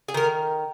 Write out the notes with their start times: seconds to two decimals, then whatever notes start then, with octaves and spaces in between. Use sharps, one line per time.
0.08 G#4
0.14 D#3 A#4